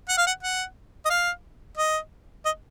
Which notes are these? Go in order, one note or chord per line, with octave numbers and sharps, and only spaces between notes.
F#5
F5
F#5
F#5
D#5
F5
D#5
D#5